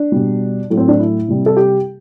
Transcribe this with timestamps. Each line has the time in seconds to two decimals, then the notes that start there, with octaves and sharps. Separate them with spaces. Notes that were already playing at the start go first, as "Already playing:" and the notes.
Already playing: D4
0.12 B2 G3
0.70 A2 F#3 A3
0.77 C4
0.88 D4
0.99 E4
1.28 C3 G3
1.46 A4
1.57 G4